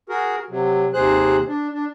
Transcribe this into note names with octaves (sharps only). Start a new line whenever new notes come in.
F#4 G#4 A#4
C3 F#3
D#2 C3 G#4 C5 F#6
D4
D4